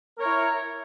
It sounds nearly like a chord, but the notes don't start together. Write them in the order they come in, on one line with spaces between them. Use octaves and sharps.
A#4 C#5 E4